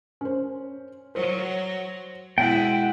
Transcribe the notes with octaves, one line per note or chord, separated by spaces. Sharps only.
C#4 C5
F#3 C5
B2 G#3 E4 F#5 G5